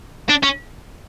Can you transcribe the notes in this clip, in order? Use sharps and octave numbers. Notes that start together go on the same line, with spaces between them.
D4
C#4